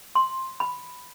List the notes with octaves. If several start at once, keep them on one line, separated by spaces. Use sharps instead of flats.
C6
B5